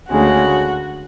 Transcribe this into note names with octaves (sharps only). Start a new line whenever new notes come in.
D2 C#3 G#3 F#4